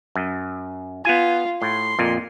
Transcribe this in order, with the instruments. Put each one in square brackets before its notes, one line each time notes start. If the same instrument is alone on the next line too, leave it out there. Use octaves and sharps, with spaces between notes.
[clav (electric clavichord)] F#2
[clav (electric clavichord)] B3 G#5 [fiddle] F4
[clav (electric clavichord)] A2 [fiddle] C6
[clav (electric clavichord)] F2 A#2